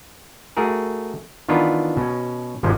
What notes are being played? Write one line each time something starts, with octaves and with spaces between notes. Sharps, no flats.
A3 F#4 G#4 A#4
D#3 E3 B3 D4 F4 B4
B2 C#4
G#1 E2 C3 F3 G#3